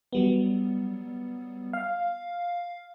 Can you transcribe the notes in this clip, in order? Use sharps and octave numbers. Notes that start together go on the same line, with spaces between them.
F#3 G3 B3
F5